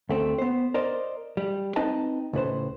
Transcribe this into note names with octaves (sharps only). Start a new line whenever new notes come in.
D2 A3 C4
B3 C5
A#4 C5 D5 D#5
G3
C4 D#4 B4 D#5 A5
C#2 A2 B4 C5